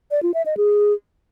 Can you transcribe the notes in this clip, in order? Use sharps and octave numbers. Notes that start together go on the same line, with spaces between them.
D5
F4
E5
D#5
G#4